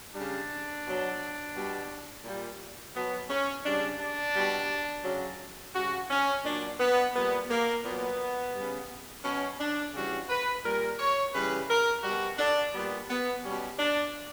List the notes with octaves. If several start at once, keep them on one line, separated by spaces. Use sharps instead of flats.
C#3 G3 D4
B2 F#3
B2 G3
A#2 G3
B2 F#3 B3
C#4
C#3 G3 D4
D4
B2 G3
C#3 F#3
C#3 G3 F#4
C#4
A#2 F#3 D4
B3
A#2 G3 B3
A#3
A#2 F#3 B3
C#3 G3
B2 F#3 C#4
D4
C#3 E3 G3 F#4
B4
A#2 G3 A#4
C#5
C#3 E3 G3 B4
A#4
B2 G3 F#4
D4
A#2 G3 B3
B3
B2 G3 C#4
D4